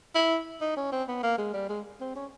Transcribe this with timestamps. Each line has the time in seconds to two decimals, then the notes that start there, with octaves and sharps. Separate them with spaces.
0.15 E4
0.61 D#4
0.77 C#4
0.92 C4
1.08 B3
1.23 A#3
1.38 G#3
1.54 G3
1.70 G#3
2.01 C4
2.16 C#4